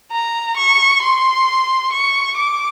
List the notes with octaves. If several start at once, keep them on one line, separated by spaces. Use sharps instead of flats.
A#5
C#6
C6
C#6
D6